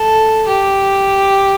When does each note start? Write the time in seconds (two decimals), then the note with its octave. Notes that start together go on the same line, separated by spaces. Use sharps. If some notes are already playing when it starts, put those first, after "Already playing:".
Already playing: A4
0.48 G4